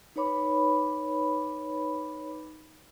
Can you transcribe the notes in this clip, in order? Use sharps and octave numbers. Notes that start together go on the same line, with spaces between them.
D#4 B4 C#5 B5 D6